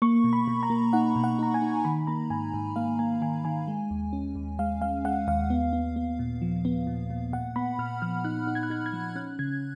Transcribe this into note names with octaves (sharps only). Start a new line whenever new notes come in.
A#3 C#6
B2
B5
B2
A#5
A#3
D#4 F#5
B2
F#5
D#4 A#5
G#5
D#4
D#3 B5
A#3 A#5
G#2 G#5
G#2
A#3 F5
A#3 G#5
D#3 G#5
D#3 G#5
G#3
D#2
C#4
D#2
G#3 F5
G#3 F5
G#3 F#5
D#2 F5
B3
B3
B3
A#2
F3
B3
A#2
A#2
A#2 F#5
B3 B5
A#2 F6
F3 F6
D#4 F#6
D#4
G#6
F#6
D#4 G#6
G#6
F3
C#4 F#6
C#3 G#6